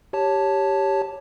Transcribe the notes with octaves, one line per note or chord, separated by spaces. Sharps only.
G4 C#5 A5